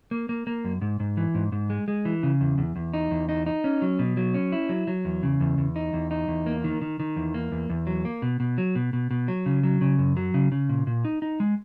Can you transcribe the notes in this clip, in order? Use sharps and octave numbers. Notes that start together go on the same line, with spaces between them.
A#3
A#3
A#3
F#2
G#2
G#2
E3
G#2
G#2
G#3
G#3
E3
C#3
E2
E2
E2
D#4
E2
D#4
D#4
C#4
F#3
B2
F#3
C#4
E4
F#3
F#3
E2
C#3
E2
E2
D#4
E2
D#4
E2
A#3
D#3
D#3
D#3
E2
A#3
E2
E2
F#3
A#3
B2
B2
F#3
B2
B2
B2
F#3
C#3
F#3
C#3
F#2
F#3
C#3
C#3
A#2
A#2
D#4
D#4
G#3